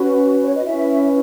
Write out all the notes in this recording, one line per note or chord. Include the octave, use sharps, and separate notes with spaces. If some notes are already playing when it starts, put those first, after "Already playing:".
Already playing: C#4 F#4 B4
C#5
D#5
C#4 E4 B4 E5